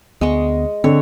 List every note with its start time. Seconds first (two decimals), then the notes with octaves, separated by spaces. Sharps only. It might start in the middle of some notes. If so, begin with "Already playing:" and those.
0.21 D2 G#3 B3 D#5 C#6
0.84 D3 C4 C#5